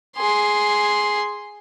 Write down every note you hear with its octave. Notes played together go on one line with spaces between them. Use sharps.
G#4 C6